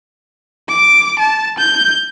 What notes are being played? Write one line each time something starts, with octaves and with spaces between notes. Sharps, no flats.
D6
A5
G6